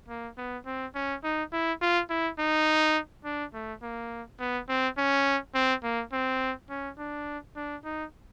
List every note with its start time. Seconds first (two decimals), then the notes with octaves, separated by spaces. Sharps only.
0.09 A#3
0.37 B3
0.66 C4
0.95 C#4
1.23 D#4
1.53 E4
1.81 F4
2.10 E4
2.39 D#4
3.24 D4
3.54 A3
3.82 A#3
4.40 B3
4.68 C4
4.97 C#4
5.54 C4
5.83 A#3
6.12 C4
6.69 C#4
6.98 D4
7.56 D4
7.84 D#4